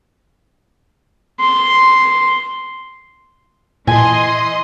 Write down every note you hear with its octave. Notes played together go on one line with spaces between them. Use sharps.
C6
A#2 E3 D#5 G#5 C6